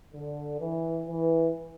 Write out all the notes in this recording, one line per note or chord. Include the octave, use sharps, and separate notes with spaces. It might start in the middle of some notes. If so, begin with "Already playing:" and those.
D3
E3
E3